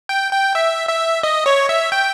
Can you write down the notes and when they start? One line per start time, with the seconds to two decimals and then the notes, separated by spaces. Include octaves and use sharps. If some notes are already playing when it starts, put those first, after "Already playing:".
0.09 G5
0.32 G5
0.55 E5
0.89 E5
1.23 D#5
1.46 C#5
1.69 E5
1.92 G5